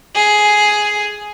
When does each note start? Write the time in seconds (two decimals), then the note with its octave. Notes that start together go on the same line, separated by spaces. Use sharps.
0.16 G#4